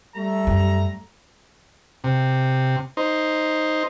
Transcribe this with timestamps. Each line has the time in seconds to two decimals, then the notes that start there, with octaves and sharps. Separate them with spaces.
0.16 G3 A3 A#5
0.47 F#2
2.04 C3
2.97 D#4 C5